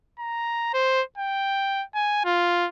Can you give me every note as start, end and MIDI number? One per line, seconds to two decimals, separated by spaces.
0.19 0.71 82
0.74 1.02 72
1.17 1.84 79
1.95 2.22 80
2.25 2.67 65